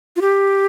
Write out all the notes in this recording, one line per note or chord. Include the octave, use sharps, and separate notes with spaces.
F4
G4